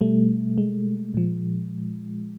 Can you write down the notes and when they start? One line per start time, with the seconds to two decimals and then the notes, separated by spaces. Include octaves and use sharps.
0.01 B2 G3 A3
0.58 G#3
1.14 A#2 F3